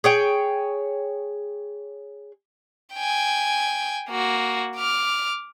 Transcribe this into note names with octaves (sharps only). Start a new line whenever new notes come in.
G#4 C#5 G5
G5 G#5
A#3 F#4
D6 F6